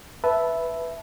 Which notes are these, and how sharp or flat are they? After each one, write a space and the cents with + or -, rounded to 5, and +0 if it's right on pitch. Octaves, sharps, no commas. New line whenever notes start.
B4 +0 E5 +0 A5 -10